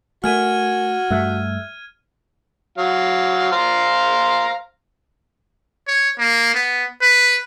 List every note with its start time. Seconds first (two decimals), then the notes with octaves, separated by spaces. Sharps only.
0.24 A3 F#4 A#4 G#5 F6 G#6 D#7
1.10 G2 A3 E5 E6 F#6
2.78 F#3 F5
3.52 C5 F5 A#5
5.88 C#5
6.19 A#3
6.55 B3
7.02 B4